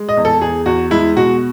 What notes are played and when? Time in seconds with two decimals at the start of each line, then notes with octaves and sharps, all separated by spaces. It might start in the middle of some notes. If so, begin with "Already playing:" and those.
Already playing: G#3
0.09 D#5
0.17 E2
0.25 A4
0.41 E2 G#4
0.66 E2 F#4
0.91 G#3 E4
1.16 B2 F#4